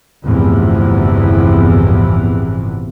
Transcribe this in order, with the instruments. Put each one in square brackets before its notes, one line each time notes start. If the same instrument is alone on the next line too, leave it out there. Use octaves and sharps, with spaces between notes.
[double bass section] G1 E2 A2 C3 E3 F3